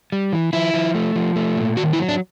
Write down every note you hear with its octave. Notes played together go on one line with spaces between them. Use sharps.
G3
E3
F3 E4
F3
A3
F3
A3
A#2
D#3 F#4
E4
F#3
D4